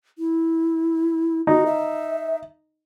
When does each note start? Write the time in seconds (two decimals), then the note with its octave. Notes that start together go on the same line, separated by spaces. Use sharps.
0.18 E4
1.47 D#4 F#4
1.66 E5